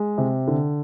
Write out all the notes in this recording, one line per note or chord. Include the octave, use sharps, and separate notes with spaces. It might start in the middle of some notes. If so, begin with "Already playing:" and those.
Already playing: G#3
C3
D3